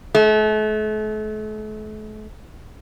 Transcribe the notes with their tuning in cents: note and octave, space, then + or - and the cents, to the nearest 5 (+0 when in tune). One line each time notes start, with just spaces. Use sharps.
A3 -40